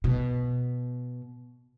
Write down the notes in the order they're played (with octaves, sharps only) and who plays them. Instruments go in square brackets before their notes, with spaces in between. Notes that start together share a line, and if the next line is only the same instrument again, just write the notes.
[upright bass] B2